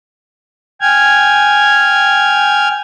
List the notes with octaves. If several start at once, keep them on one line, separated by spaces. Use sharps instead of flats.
G5 G#5 F6 G#6